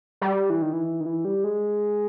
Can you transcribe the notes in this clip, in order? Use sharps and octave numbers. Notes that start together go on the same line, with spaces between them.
G3
E3
D#3
E3
D#3
E3
G3
G#3